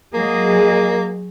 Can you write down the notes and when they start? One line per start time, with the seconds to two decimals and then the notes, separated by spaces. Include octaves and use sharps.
0.14 F#3 A#3 G#4 D#5